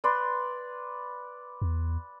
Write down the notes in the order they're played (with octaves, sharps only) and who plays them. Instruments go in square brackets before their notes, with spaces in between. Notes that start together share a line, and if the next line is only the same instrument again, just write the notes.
[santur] B4 D5 C6
[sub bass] E2